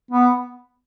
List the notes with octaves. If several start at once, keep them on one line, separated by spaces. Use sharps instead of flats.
B3